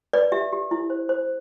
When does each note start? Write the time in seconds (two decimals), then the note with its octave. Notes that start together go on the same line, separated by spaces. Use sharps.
0.13 B4 D5
0.32 G4 E5
0.52 G4
0.71 E4
0.90 C5
1.09 C5